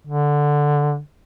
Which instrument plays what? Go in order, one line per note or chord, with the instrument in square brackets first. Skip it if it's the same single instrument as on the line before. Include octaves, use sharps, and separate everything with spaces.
[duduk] D3